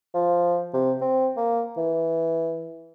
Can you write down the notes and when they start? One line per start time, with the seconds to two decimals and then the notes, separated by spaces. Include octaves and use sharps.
0.14 F3
0.74 C3
1.01 C4
1.37 A#3
1.77 E3